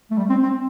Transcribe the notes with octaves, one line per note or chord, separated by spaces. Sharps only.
A3
G3
C4
C4